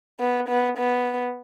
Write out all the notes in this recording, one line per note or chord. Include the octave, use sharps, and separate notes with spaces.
B3
B3
B3